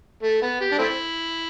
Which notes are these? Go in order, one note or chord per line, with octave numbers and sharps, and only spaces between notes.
A3
B3
G4
D4
A3 C4 E4